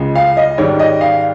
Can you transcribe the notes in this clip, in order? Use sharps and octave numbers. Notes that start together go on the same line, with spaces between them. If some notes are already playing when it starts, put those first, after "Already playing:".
Already playing: C#2 C#3 G#3
F5
D#5
G#2 D#3 G3 C#5
D#5
F5